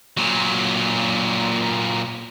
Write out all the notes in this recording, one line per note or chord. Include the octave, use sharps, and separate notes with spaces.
A#2 F#3